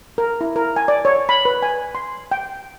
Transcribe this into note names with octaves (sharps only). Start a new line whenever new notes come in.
A#4
E4
A#4
G#5
D5
C#5
B5
B4
G#5
C6
G5